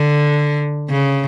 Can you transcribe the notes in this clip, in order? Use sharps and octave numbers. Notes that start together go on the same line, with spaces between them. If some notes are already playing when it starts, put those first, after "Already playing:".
Already playing: D3
C#3